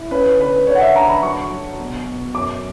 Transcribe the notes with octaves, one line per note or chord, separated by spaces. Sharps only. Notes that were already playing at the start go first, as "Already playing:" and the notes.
Already playing: E4
C#4 B4
D3 B4
D3 C#5
F#5
E5
D4 A#5
B5
F#3 C#6
F#3
B2
B2
F#2 D6